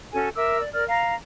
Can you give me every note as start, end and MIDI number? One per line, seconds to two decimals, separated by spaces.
0.13 0.28 61
0.13 0.28 66
0.13 0.28 69
0.13 0.28 80
0.36 0.59 70
0.36 0.59 76
0.36 0.59 86
0.36 0.59 88
0.60 0.71 74
0.73 0.83 70
0.73 0.83 74
0.73 0.83 89
0.88 1.15 77
0.88 1.15 82